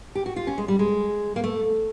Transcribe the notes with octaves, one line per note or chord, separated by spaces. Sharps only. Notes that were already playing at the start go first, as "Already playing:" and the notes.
G4
F#4
F4
C#4
G#3
G3
G#3
A#3
A3